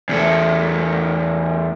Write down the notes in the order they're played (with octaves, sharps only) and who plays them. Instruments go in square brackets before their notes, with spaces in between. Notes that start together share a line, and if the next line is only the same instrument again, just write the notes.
[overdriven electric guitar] E2 A3